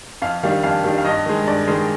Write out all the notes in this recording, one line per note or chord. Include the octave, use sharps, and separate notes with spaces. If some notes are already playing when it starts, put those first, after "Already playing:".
F2 F5
D#3 G3 D4 F5
F2 F5
D#3 G3 D4
F5
G2 D#5
D#3 G#3
G2 D5
D#3 G#3